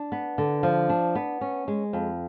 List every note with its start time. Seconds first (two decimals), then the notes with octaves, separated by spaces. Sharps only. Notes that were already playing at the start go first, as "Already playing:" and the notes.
Already playing: D4
0.12 B3
0.38 D3
0.63 F3
0.89 D4
1.15 B3
1.41 C#4
1.68 G#3
1.93 F2